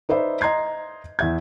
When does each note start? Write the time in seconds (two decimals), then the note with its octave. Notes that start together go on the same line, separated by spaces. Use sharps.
0.09 D#4 B4 C5 D5 E5
0.41 D#5 A#5 C6 G#6 C7
1.19 E2 E5 G#6